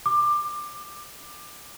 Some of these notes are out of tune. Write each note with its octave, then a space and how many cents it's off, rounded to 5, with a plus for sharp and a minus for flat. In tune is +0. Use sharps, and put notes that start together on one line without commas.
D6 +20